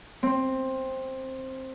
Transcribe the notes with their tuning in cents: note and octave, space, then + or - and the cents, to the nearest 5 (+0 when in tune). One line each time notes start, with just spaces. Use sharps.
C4 +10